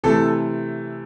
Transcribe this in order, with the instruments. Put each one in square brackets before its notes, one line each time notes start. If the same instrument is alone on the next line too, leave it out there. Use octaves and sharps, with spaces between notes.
[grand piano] C3 E3 A3 A4